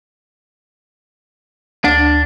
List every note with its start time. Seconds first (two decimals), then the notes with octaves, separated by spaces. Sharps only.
1.84 D2 D4